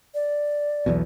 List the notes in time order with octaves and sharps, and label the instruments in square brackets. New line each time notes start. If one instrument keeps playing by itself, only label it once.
[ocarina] D5
[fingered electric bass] B1 E2 B2